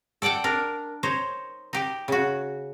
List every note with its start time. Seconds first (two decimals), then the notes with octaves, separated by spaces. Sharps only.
0.22 A4 D5 F#5 G5 A5
0.44 D4 A#4
1.03 D#4 C5 C#5
1.73 D#4 G4
2.08 C#3 F#4